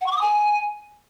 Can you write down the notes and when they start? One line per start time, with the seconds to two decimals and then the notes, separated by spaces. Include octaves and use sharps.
0.01 F#5
0.06 C#6
0.11 D6
0.16 D#6
0.21 G#5